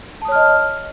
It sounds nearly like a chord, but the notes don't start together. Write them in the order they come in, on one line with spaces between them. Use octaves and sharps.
A5 D#6 C#5 F6 D#5